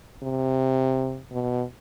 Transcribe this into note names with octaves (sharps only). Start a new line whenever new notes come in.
C3
B2